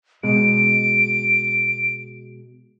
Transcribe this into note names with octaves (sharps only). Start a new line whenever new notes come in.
B2 G#3 D7